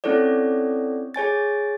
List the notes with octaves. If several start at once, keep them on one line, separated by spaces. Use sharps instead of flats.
C4 C#4 E4 A4 C#5 D5
G#4 C#5 G#5 A6